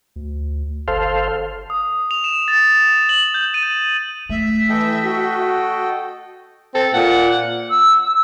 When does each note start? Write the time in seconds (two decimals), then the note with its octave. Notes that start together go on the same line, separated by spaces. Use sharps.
0.16 D2
0.88 G1 A4 C5 F5
1.70 D#6
2.11 F7
2.24 E7
2.48 A6
3.09 F#7
3.34 G6
3.54 D#7
4.29 A3 E5
4.69 E3 A4 D#5 G5
5.04 F#4
6.75 C4 A4
6.94 A#2 F#5
7.70 E6